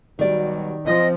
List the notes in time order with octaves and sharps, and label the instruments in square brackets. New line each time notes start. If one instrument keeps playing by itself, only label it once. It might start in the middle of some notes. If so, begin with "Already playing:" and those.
[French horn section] B2 F#3 G3 [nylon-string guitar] D#3 D5
[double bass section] F3 [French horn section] C4 [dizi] D#5